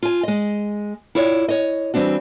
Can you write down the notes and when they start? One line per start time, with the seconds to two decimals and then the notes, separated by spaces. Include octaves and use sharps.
0.02 F4 G#5
0.23 G#3 D#5
1.15 E4 F4 C#5 D5
1.48 C#5 D#5
1.94 E3 G3 C4 D4 F#4